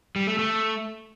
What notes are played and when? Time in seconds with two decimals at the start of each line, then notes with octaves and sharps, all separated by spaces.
0.16 G3
0.27 A3
0.39 A3